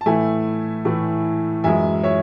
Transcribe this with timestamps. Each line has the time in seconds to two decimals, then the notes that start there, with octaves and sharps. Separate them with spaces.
0.01 A5
0.06 A2 E3 A3 E5 G#5
0.85 A2 E3 A3
1.64 F#2 E3 G#3 E5 G#5
2.04 C#5 E5